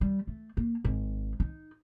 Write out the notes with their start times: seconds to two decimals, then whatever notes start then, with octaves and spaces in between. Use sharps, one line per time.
0.01 G3
0.27 A3
0.57 A#3
0.84 G#1
1.40 D#4